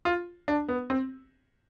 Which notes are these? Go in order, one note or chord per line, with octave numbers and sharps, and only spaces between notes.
F4
D4
B3
C4